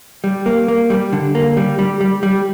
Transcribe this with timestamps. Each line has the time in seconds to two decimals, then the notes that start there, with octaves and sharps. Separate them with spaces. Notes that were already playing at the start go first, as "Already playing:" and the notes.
0.24 G3
0.46 A#3
0.68 A#3
0.90 G3
1.13 D3
1.35 A#3
1.57 G3
1.79 G3
2.01 G3
2.23 G3